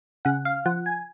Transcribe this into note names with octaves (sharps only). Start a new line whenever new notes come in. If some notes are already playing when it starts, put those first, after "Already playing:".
C#3 F#5
F5
F3 F#5
G#5